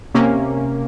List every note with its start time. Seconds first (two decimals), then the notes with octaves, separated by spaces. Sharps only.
0.14 C3 A#3 C#4